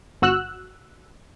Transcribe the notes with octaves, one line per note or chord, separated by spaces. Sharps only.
G1 F#4 E6 F#6